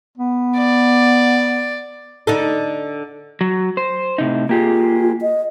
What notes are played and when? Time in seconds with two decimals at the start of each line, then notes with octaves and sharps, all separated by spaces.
0.18 B3
0.57 D5
2.27 D3 D#4 A4
3.41 F#3
3.77 C5
4.18 A2 C3 D#4
4.49 A#3 F4 G4 G#4
5.21 D#5